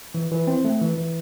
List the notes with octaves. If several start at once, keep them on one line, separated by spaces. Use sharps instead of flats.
E3
E3
C4
A3
E3
E3